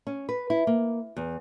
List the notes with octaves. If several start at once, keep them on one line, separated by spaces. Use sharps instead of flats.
C#4
B4
E4
A#3
E2